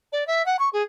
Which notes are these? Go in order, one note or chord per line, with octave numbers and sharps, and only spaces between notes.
D5
E5
F#5
C#6
G#4